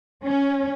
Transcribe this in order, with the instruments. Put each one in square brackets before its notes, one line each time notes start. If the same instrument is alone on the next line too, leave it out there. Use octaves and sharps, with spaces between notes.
[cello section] C#4